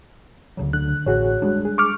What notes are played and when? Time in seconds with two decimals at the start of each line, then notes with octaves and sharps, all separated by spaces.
0.57 D2 C#3 F#3
0.73 D3 F#6
1.06 A1 F#4 G#4 C#5
1.42 G3 G#3 D4
1.65 G#4
1.78 C#6 D6 F6